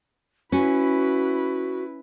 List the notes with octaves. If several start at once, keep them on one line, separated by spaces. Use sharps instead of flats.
C#4 E4 F#4 B4